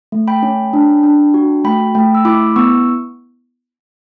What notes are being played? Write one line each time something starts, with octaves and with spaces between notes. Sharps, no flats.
A3
G5 B5
C#4
D4
D4
F#4
A3 G5 B5
A3 G5 B5
E6
E4 B5 D6
B3 C#6 E6